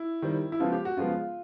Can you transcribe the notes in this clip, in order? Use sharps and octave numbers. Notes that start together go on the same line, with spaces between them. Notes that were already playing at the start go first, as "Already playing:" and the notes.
Already playing: E4
D#3 G3 C4
E4
C#3 F3 G#3 B3 F4
G4
F#4
C#3 F3 G#3 B3 F4